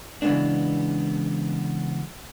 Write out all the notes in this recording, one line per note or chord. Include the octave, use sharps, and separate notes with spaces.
C#3 E3 F3 G#3 B3 D4